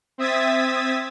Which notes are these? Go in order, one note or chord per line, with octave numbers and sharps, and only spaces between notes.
C4 E5 D#6 G#6 A6 B6